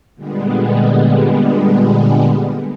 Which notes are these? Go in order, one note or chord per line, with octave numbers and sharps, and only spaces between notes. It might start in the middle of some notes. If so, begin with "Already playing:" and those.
A#2 D3 G3 G#3 B3